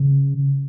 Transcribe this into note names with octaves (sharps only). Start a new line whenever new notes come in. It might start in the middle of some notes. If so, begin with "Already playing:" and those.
Already playing: C#3